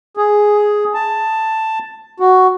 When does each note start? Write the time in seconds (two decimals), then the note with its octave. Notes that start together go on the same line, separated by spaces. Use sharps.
0.17 G#4
0.95 A5
2.20 F#4